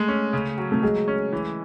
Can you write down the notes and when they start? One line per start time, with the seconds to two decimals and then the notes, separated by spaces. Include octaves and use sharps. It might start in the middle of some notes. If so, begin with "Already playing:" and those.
Already playing: G#3 A3
0.08 C#4
0.33 C#3
0.58 F#3
0.72 A3
0.83 F#3 G#3
1.08 C#4
1.33 E3